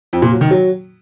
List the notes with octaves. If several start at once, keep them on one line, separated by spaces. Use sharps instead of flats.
F2
A#2
F#3
D#3
F#3